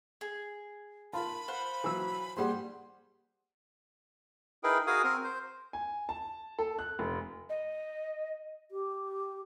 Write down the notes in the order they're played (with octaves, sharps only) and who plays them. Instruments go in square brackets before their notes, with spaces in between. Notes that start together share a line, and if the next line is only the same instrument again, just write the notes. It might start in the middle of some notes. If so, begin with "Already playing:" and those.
[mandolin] G#4
[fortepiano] F4 A#4 [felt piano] A5 [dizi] B5
[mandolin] C5 F5 F#5
[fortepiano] E3 F#3 E6
[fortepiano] G3 C5 [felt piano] A#3 G#4 F#5 [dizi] C6
[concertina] D#4 E4 G#4 A#4 B4 G5
F#4 G#4 A#4 F5 G#5 D#6
C4 A#4
C5
[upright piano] G#5
A5
A4
F#6
F1
[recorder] D#5
[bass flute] G4